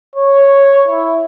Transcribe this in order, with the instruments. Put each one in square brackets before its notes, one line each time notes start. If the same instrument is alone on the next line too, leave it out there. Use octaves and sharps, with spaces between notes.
[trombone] C#5
E4